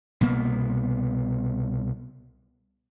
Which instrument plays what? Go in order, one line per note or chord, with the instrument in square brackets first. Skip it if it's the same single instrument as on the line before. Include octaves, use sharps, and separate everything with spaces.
[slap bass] C2 B2 A#3 B3